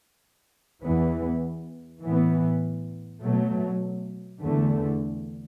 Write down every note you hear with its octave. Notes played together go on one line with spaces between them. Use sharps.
E2 E3 B3
A2 E3 B3
B2 F#3 A3
E2 D3 A3